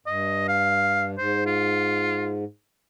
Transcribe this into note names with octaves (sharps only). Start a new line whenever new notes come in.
G2 D#5
F5
G#2 C5
F4